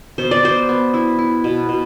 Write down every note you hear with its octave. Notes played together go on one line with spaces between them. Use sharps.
B2 C5
D5
B2 C5
B3
E4
E4
B2
B2